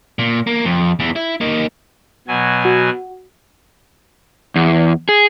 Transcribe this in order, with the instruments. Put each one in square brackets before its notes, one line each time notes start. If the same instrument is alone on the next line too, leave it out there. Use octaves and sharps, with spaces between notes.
[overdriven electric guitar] A#2
A#3
F2
E2 E3
E4
A#3 D#4
[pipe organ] B2 F#3 G#5
[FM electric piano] F#4
[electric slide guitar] E2
G#4